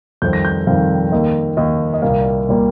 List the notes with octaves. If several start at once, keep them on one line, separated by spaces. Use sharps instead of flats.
F2 D#3 G3 C4 G6
A#6
G6
F2 D#3 G3 C4 F5
D#2 D#3 A#3 D#5
D#2 D#3 A#3 D#5
D#5
C2 A#2 G3 A#3 F5
A#2 G3 A#3